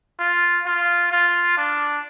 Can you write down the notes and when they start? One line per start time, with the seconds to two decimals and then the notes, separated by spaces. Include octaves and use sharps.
0.19 F4
0.66 F4
1.11 F4
1.57 D4